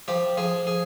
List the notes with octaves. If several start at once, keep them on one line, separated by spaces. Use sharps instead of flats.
F3 G4
F3 G#4
G#4